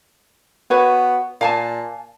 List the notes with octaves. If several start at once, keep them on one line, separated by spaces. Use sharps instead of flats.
B3 F#4 B4 C#5
A#2 F5 G#5 A5